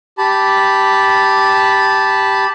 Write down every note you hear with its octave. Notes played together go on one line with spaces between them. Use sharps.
G4 A5 B5